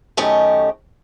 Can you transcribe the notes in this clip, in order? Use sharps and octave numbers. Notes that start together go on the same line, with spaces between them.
F#2 D#3 A3 C#4 G4 D#5